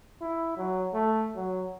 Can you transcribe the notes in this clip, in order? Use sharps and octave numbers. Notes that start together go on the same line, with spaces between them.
E4
F#3
A3
F#3